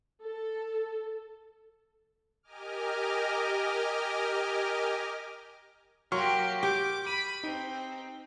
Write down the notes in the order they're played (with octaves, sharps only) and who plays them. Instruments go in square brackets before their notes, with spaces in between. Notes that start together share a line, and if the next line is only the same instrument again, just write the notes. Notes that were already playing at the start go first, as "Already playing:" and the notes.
[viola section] A4
[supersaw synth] G4 A#4 D#5 G#5 D6 F6
[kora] F#3 [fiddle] A#3 G4 [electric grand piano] C6 C#6 F6
[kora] G4 [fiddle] D6
[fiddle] B5 [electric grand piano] D#7
[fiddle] C4 [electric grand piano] D#4